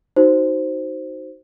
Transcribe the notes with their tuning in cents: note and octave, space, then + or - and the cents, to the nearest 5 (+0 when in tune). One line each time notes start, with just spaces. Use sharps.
D#4 +0 F#4 +20 C5 +0